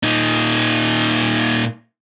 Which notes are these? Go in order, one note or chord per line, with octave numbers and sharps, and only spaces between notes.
A#2 D#4